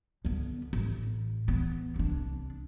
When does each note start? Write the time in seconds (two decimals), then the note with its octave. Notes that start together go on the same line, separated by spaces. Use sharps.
0.25 D3 B3
0.73 A1
1.48 E3 B3
1.96 C2 D4